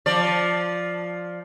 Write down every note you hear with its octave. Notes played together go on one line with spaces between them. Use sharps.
F3 D5